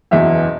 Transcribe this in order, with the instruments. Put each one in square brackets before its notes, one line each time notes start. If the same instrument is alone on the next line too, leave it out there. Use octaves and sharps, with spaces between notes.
[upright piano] F#1 E2 B2 E5